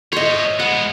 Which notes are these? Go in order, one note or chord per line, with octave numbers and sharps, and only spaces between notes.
C5 C#5 D#5 E5
G#3 B3 F#5